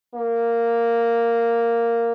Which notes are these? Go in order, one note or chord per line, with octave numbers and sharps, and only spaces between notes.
A#3